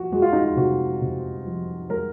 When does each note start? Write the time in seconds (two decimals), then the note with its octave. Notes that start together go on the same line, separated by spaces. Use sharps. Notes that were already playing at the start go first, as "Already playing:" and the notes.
Already playing: F3 F#4
0.12 G#3 F#4
0.22 F4
0.33 D#4
0.44 F4
0.56 C3 F#4
1.01 C3
1.46 F3
1.90 G#3 A#4